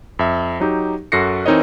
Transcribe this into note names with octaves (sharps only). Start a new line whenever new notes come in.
F2 E5
F#3 D#4 G4
F#2 F#4 A4 A#6 C7 C#7
E3 C4 D#4 A#4 C#5 D#5